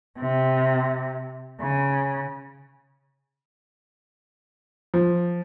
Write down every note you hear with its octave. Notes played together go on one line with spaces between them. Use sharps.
C3
C#3
F3